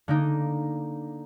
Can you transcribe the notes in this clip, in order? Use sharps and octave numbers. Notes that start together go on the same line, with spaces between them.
D3 A#3 D#4